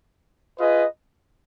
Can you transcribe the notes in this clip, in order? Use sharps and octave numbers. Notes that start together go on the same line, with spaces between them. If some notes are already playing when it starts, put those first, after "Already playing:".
F4 G#4 B4 D#5